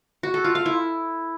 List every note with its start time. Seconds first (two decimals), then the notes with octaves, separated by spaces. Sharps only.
0.23 F#4
0.34 A4
0.44 F4
0.55 F5
0.66 E4